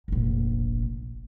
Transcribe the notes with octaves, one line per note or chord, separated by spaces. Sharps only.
F1 A#1